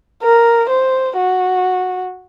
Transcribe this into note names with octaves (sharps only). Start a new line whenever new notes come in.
A#4
C5
F#4